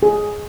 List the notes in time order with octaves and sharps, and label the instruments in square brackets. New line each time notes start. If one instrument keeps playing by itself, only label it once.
[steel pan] G#4